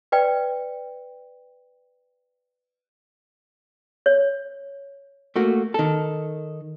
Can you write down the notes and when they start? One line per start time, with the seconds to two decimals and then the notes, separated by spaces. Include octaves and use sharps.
0.12 B4 D5 G5
4.06 C#5
5.36 A3 A#3 F#4
5.74 D#3 A4